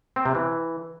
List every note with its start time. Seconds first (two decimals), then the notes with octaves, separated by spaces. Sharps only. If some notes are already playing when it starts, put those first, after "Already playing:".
0.16 C4
0.26 C3
0.35 E3